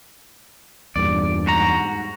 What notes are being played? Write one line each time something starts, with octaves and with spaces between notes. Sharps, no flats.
E2 G2 A#2 D5
G#2 F#4 A#5